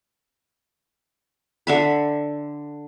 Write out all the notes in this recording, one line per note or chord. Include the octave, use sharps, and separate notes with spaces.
D3 E5 B5